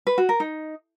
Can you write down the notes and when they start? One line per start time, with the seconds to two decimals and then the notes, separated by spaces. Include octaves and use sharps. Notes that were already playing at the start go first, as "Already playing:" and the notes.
0.07 B4
0.18 F#4
0.29 A#4
0.40 D#4